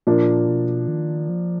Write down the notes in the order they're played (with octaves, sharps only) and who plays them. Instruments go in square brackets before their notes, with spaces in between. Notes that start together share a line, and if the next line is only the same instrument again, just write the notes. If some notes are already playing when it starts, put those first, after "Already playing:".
[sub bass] A#2 [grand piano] F3 A#3 D4
[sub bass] B2
D#3
F3